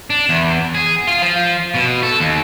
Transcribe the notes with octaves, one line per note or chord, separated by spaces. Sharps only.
D4
E2
G#4
F4
F3
B2
A4
D#2